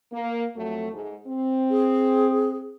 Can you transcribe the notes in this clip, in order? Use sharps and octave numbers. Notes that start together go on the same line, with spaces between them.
A#3
F2 F#3 A3
G#2
C4
G#4